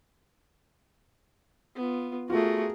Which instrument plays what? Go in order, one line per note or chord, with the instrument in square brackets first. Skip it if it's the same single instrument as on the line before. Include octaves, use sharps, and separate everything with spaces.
[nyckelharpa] B3 F4
[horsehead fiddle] A3 F#4 [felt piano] F4 [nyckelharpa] G#4 A#4